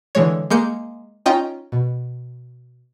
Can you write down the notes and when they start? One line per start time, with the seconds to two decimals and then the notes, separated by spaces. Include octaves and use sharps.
0.15 D3 E3 G#3 C#5
0.50 G#3 A#3 G6 C#7
1.26 C#4 D#4 F4 D#5 G5
1.72 B2